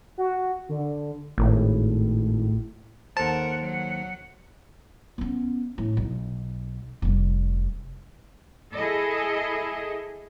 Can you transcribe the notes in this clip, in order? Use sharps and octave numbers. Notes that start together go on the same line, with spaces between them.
F#4
D3
G#1 A2
D#2 A4 A#4 C5 F#5 A5
F#3 F#5
B3 C#4
A2
B1
F1 G3
E4 G#4 A4 D#5